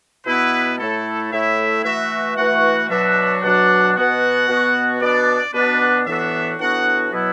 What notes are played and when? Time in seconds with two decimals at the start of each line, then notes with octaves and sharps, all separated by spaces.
0.26 B2 B3 E4 B4
0.78 A2 A3 E4 A4
1.31 A2 A3 E4 E5
1.84 E3 A3 F#4 E5
2.36 E3 A3 F#4 F#5
2.89 B2 F#3 D4 F#4 E5
3.42 B2 F#3 D4 F#4 F#5
3.95 B2 B3 F#4 F#5
4.48 B2 B3 F#4
5.00 B2 B3 D4 D5
5.53 B2 B3 D4 B4
6.06 A2 E3 B3 D4 F#4 E5
6.59 A2 E3 B3 D4 F#4 F#5
7.12 B2 F#3 B3 E4